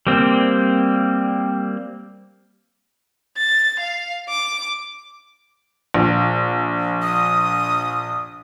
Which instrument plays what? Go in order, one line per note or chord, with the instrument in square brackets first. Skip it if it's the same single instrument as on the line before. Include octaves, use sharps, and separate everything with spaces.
[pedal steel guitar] G3 A#3 C4
[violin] A6
F5
D6
[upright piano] A#1
[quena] D#6